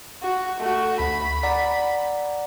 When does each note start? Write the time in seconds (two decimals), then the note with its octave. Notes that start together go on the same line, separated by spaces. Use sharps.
0.22 F#4
0.60 A3 F#4
1.00 D2 B5
1.43 D5 F#5 A#5